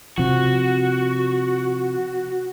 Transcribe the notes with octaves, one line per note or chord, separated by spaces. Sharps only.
C3 F3 F#4